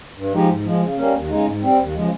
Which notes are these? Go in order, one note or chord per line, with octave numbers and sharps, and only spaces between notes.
G2
F3 G#3 D#4 G4
G#2
F3 G#3
C#3
G3 A#3 C#4
D#2
C#3 G#3 D#4
G#2
G3 C4
D#2
C#3 F3 G#3